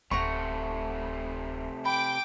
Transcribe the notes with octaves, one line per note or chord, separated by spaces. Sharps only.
D1 C3 A3 F#5 A#5 C#6
G5 B5 D6